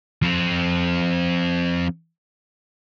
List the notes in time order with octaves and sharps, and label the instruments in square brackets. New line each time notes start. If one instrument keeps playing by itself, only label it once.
[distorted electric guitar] F3 C4